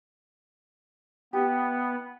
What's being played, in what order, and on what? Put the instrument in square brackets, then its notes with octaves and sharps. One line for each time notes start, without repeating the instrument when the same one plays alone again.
[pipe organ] B3 [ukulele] E4 G4